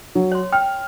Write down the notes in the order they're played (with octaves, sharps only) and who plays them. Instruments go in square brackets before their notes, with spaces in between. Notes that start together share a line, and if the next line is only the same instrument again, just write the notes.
[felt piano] F#3
[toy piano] C#5 C6
[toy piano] G5 [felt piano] F6